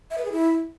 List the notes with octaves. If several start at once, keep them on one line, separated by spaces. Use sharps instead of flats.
E5
B4
G#4
E4